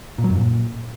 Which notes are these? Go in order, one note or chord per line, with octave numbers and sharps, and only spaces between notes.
A#2
F#3
F#2
A#2